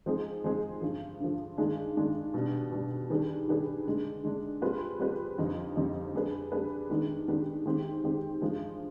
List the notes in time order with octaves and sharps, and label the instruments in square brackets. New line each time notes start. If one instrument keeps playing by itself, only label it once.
[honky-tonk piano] F3 G#3 C4 D#4 G#4
F3 G#3 C4 D#4 G#4
G2 D3 F3
G2 D3 F3
G2 D#3 G#3 D4 G#4
G2 D#3 G#3 D4 G#4
B2 G3 D4
B2 G3 D4
D#3 G3 D4 G#4 B4
D#3 G3 D4 G#4 B4
D3 G#3 D4
D3 G#3 D4
G3 C4 F4 G#4 B4
G3 C4 F4 G#4 B4
F2 D3 G3 C4 D#4
F2 D3 G3 C4 D#4
G3 D4 G#4 B4
G3 D4 G#4 B4
D#3 G#3 B3 D4 G4
D#3 G#3 B3 D4 G4
D#3 G#3 C4 G4
D#3 G#3 C4 G4
G2 F3 G#3